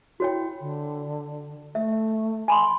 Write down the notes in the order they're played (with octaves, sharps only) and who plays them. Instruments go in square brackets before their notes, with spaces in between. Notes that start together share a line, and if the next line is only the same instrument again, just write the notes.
[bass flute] E4 [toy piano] F#4 C#5 G5
[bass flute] D3
[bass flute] A3 [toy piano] E5
[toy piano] G#5 B5 C6